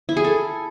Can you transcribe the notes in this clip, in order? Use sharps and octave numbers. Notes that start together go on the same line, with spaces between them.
E4
G#4
A4